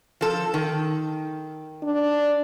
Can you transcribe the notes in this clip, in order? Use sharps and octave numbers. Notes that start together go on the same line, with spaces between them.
F3 A4
D#3
D4